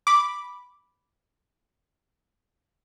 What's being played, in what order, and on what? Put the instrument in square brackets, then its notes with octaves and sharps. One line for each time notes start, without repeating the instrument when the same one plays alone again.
[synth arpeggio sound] B5 D6